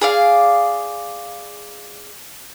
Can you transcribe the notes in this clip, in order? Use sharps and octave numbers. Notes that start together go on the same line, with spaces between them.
G#4 D5 F5